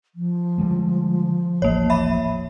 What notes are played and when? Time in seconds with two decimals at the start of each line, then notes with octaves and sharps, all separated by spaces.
0.15 F3
0.58 D3 G3 G#3
1.62 D#1 A1 A#3 C#5
1.90 E5 B5